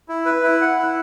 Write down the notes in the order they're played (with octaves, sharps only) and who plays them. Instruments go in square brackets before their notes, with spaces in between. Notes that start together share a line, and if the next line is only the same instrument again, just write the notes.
[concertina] E4
B4
E4
F#5
E4